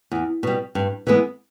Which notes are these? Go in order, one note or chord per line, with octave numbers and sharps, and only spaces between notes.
E2
B2 G3
G2
E3 G#3 B3